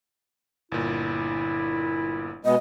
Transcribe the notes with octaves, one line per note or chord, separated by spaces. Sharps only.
G1 A#2 E4
B2 G#3 B3 D#5